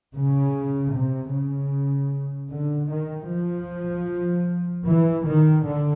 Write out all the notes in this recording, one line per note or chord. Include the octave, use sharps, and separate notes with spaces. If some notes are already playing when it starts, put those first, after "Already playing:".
C#3
C3
C#3
D3
D#3
F3
E3
D#3
D3